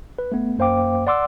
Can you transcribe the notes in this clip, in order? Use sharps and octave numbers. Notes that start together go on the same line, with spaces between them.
B4
A3 B3
F#2 A#3 C5 F5 G5 D6
D5 F#5 C6 D6 E6